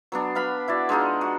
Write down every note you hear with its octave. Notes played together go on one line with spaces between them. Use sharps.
F#3 B3 D4
B3 F5 B5
E4 F#4 D5
G#3 D4 D#4 F4
F#4